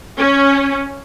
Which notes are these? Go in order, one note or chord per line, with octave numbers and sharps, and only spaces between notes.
C#4